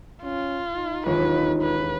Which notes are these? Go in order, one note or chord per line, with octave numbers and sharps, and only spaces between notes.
C#4 F4
D#4
E1 D#2 F4 B4 A#6
B4